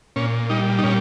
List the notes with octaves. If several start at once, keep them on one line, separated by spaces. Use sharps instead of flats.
A#2 C#4
G3 D#4
D#4
A#2 C#4